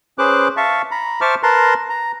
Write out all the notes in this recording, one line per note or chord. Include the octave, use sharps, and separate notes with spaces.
C#4 G#4 B4 C5 D6 F#6
E5 F5 A5 C#6
A#5 B5
C5 E5 A5 C#6 D6 F6
A#4 B4 A5 A#5 C6
A#5